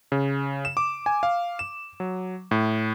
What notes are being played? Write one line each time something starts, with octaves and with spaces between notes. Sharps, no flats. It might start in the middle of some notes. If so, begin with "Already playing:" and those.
C#3
E7
D6
G#5
F5
E7
F#3
A2